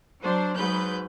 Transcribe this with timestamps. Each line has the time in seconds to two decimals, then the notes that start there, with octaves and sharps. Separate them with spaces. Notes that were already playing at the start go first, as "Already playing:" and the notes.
0.21 F#3 D4 C5
0.57 G#2 F#3 B4 G6